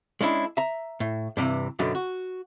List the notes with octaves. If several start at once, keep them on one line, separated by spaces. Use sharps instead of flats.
G#3 C#4 D4 E4
E5 A#5
A2
G2 C3 E3
F#2 B2 D3 F#3
F#4